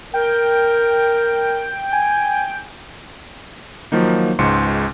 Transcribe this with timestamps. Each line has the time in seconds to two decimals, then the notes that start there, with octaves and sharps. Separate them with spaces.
0.14 A#4 G5
1.92 G#5
3.92 D#3 F3 F#3 A#3 D#4
4.39 C#2 G#2 G#3 C6 C#7